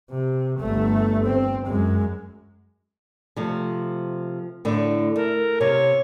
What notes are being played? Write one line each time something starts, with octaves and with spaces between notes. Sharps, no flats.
C3
G1 A3
C4
F#2 G#3
C3 F3 A3
A2 D3 A3
A3 A#4
C3 C#5